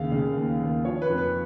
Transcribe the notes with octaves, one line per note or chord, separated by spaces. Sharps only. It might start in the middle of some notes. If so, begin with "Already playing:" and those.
Already playing: D#2 C#3 F5
C#3
D#2
D#2
F3 C#5
B4
F2
B4